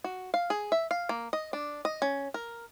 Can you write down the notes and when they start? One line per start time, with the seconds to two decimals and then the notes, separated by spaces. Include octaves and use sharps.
0.04 F#4
0.34 F5
0.50 G#4
0.72 E5
0.91 F5
1.09 A#3
1.33 D#5
1.53 D4
1.85 D#5
2.02 C#4
2.34 A#4